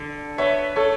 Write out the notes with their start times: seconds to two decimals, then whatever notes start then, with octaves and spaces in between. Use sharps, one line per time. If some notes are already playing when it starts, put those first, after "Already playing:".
Already playing: D3
0.38 B3 C#5 E5
0.75 A3 A4 C#5